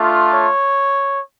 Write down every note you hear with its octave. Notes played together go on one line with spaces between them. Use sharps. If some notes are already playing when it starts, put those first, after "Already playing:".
Already playing: A3 D4 F4
C#5